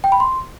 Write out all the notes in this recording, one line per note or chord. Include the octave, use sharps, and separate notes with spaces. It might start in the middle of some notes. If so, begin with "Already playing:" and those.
G5
B5
C6